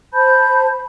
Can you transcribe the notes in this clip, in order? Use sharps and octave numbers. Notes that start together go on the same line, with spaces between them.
C5 A5 B5 G6